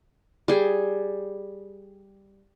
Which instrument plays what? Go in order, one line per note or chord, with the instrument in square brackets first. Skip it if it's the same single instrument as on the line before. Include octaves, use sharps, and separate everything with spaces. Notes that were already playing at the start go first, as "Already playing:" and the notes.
[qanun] G3 G#4